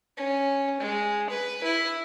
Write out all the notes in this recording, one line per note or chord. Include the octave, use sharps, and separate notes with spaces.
C#4
G#3
B4
E4